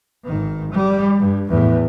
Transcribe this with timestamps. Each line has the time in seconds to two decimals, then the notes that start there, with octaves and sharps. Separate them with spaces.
0.24 G#1 D#3
0.72 G3
1.18 G2
1.49 E2 A2